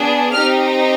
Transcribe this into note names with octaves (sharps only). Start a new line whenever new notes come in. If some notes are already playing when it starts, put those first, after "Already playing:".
Already playing: B3 D4 G#4
C4 D#4 G4 F6